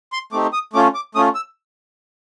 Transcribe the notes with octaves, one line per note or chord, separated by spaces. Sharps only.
C6
A3 C4 D#4 G4 D6
D#6
A3 C#4 F4 D6
D6
A3 C#4 F4 D#6
E6